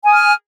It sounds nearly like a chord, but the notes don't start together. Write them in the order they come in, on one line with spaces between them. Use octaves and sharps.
G#5 D#6 F6